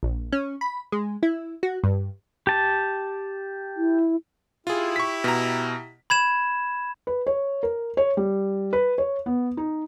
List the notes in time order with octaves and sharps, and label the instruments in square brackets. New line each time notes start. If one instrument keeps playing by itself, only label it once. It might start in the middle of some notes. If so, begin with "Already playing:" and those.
[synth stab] A#1
C#4
B5
G#3
E4
F#4
G2
[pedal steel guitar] G4 A5
[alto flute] E4
[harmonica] E4 G4 [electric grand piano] F4 G#4
[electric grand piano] C#6 B6
B2 A#5
[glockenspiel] B5 G#6 E7
[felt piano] B4
C#5
A#4
C#5
G3
B4
C#5
B3
D#4